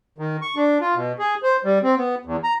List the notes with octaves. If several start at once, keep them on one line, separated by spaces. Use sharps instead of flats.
D#3
C#6
D4
F4
B2
G#4
C5
G3
C4
B3
E2
A#5